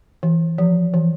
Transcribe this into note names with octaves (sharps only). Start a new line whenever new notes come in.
E3
F3
E3